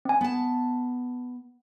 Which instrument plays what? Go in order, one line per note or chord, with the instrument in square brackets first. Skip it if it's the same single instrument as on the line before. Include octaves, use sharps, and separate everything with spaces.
[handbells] C4 G#5
[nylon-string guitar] B3 A5